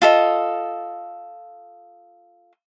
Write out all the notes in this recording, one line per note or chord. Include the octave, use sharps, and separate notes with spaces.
F4 A4 D#5